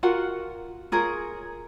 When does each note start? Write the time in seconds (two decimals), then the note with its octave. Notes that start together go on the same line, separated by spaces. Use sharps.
0.03 F4 F#4 A#4 F#5
0.92 F4 G#4 A#4 C#5